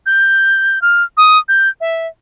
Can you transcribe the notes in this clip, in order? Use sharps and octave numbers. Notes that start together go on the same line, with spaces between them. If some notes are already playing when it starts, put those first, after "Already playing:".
G6
F6
D#6
G6
E5